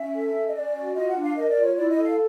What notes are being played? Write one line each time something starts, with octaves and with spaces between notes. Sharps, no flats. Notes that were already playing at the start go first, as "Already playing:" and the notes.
Already playing: C#4 E5
A4
C#4
D#5
C#4 D5
F#4
F4 D#5
F#5
D4
F5
A#4 D#5
D5
F4
C#5
E4 D5
D#5
A4
F5